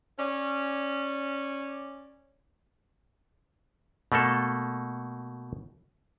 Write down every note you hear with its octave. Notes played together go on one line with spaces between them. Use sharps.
C#4 D5
B2 A3 A#3 A4